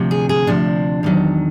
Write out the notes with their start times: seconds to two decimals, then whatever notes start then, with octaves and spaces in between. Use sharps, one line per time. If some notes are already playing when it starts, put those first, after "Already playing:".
Already playing: D2 C3 F3
0.11 G#4
0.29 G#4
0.47 D2 C3 F3 D4
1.03 E2 C3 D#3 F#3